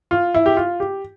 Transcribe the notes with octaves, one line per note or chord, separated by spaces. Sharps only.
F4
E4
G4
F4
G4